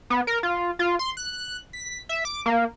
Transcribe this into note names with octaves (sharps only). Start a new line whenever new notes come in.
B3
A#4
F4
F4
C6
F#6
B6
E5
D6
A#3